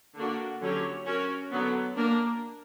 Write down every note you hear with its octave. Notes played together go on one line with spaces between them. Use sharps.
D3 A#3 D4 F#4
D3 F#3 C#4 G4 C#5
C#4 F#4 A#4 C#5
D3 F#3 B3
A#3 D4 A#4